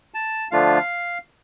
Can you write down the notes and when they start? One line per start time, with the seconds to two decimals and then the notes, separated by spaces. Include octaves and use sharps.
0.14 A5
0.51 D3 F3 A3 D4 F4 F5